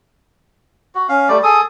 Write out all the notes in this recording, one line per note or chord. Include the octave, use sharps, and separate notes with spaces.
F#4
C#4 F5
G3 A3 D5
G#4 A4 D#6